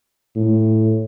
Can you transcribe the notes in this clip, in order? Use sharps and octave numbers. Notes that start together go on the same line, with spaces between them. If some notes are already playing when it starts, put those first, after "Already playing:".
A2